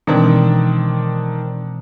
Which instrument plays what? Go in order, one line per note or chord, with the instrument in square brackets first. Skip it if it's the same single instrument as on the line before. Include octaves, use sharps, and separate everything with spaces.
[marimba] B2 E3 G#3 [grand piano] D#3 C4 D4